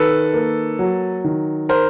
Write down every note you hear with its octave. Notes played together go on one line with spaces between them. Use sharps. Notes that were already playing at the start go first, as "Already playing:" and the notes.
Already playing: D#3 A4 B4
A#3
F#3
D#3
A#4 C5